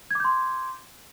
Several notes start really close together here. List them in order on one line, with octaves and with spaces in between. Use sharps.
G#6 D6 G6 C6